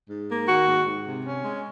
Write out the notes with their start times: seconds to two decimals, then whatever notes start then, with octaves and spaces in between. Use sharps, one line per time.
0.10 G#2
0.30 A#3
0.48 D#3 F#4
0.67 G#2
0.86 G#2
1.06 C3
1.24 C#4
1.44 G#3